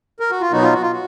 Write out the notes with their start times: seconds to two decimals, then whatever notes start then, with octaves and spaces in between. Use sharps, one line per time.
0.20 A#4
0.31 F#4
0.41 F4
0.52 B2 F#3 B3 D#4 F#4
0.62 F4
0.73 F#4
0.82 F4
0.92 F#4